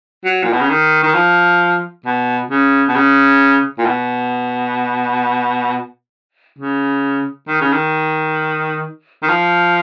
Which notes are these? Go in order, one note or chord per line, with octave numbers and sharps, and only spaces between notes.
F#3
A#2
B2
C#3
D#3
D#3
F3
B2
C#3
B2
C#3
A#2
B2
C#3
D#3
C#3
D#3
D#3
F3